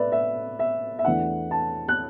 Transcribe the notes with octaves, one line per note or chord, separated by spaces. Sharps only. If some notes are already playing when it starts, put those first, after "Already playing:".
Already playing: A2 A3 B4 D5 E5
E5
E5
E5
E2 E3 A3 D4 F#5
A5
F#6